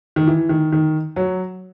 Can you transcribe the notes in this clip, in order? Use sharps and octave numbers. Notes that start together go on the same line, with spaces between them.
D#3
E3
D#3
D#3
F#3